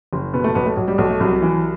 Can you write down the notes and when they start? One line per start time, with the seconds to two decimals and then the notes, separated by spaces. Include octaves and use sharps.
0.13 F#1
0.34 B2 B3
0.44 A3
0.55 B1 B3
0.66 A3
0.76 B1 F#3
0.88 G3
0.98 B1 A3
1.10 A3
1.20 C2 F#3
1.42 E3